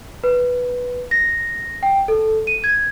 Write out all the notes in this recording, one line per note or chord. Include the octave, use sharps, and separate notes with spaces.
B4
A#6
G5
A4
D#7
G#6